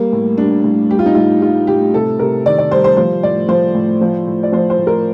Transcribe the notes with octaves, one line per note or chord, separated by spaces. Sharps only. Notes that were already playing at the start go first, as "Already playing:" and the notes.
Already playing: G3 A#3
A2
G3 D4
A2
G3 G4
F4
D#4
A2 F4
G3 F4
A2 G4
C3 A4
C3 A#4
D#3 D5
D5
G3 C5
C5
F3 C5
A2 D5
F3 C5
A2
F3
A2
D5
F3 C5
C5
A2
A#4